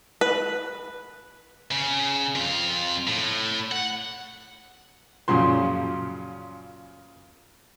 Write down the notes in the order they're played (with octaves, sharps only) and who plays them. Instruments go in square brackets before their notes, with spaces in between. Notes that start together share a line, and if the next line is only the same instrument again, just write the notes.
[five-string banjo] B4
[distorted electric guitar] C#3
F2 F4
A2
F#5
[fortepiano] F#2 A#2 C#3 F3 C6